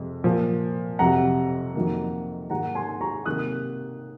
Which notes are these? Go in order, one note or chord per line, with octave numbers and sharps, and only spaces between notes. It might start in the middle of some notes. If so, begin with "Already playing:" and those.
Already playing: F2 C3 G#3
A#2 F3 A#3
F2 C3 F#3 F#5 A#5
F2 D#3 F#3 A#3
G#2 D#3 A#3 F#5 A#5
G#5 C6
A#5 C#6
C3 D#3 A#3 D#6 F#6